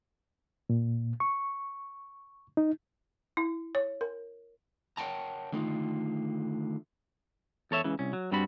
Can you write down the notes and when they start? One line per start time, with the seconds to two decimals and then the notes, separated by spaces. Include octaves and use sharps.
0.70 A#2
1.20 C#6
2.57 D#4
3.37 E4
3.75 C#5
4.01 A#4
4.97 A#4 C#5 F#5 G5 A5 A#5
5.52 D3 D#3 A3 D#4 F4
7.71 E2 A4 C#5 E5
7.84 C#2 C#3 E3
7.99 C2 C#4
8.13 F#3
8.32 G2 G3 C4 D4 F#4 B5